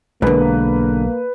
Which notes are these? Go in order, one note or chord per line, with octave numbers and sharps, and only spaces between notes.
B1 G#2 D3 G#3 A#3 B4